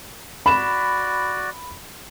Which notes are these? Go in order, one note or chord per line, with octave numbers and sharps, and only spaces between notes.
F#4 D5 B5 E7